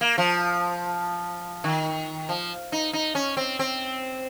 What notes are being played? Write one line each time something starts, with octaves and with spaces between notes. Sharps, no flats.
A#3
F3
D#3
F3
D#4
D#4
C#4
C4
C4